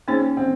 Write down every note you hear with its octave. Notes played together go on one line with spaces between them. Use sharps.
A#3 C#4 D#4 G#4 C5
C4